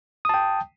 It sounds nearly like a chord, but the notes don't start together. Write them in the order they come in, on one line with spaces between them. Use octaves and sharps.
D#6 A5 G5